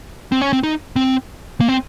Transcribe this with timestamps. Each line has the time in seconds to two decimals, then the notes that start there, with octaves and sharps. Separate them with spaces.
0.32 C4
0.41 C#4
0.53 C4
0.63 D#4
0.96 C4
1.61 A#3
1.69 C4